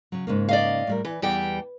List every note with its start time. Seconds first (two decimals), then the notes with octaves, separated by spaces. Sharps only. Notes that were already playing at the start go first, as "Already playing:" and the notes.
0.12 C#3 F#3
0.27 G#2 C#3 A#3
0.49 D5 D#5 F5
0.87 A2 G3 A#4
1.05 E3 B4
1.22 E2 G3 G5